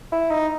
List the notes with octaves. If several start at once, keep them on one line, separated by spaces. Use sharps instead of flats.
E4
D#4